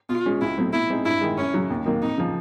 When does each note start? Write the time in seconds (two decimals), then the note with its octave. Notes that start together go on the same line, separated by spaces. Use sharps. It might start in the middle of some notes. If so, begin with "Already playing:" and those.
0.09 B2 F4
0.26 G#3 C#4
0.41 C#2 E4
0.57 B2 F#3 A3 C4
0.73 B2 E4
0.90 G#3 C4 D#4
1.05 G2 E4
1.21 D#3 G#3
1.37 F#2 C#4
1.54 C#3 F#3
1.70 D#2
1.86 D#3 F#3 A#3
2.02 F2 D#4
2.18 C#3 F3